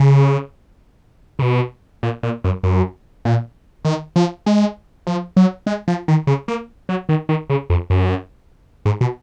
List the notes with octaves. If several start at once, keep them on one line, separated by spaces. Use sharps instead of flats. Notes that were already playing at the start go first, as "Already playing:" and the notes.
Already playing: C#3
C#3
B2
A#2
A#2
F#2
F#2
A#2
D#3
F3
G#3
F3
F#3
G#3
F3
D#3
C#3
A#3
F#3
D#3
D#3
C#3
F2
F#2
G#2
B2